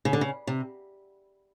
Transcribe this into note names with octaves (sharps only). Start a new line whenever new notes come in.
C#3
D3
C#3
C3